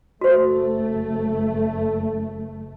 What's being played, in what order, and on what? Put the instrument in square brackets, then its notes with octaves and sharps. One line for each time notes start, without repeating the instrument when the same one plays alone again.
[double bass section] F#1 A3 [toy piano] F#4 C5